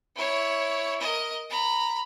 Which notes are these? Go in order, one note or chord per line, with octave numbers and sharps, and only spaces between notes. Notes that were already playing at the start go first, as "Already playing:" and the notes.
E4 C#5
A#4 D#5
A#5 B5